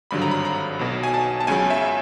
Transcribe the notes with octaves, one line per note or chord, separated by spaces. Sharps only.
G#1 G2 D3 F#3 B5
A#5
B5
A#5
B1 B2 F#3
G#5
A5
A5
C#2 C#3 F#3 G#5
E5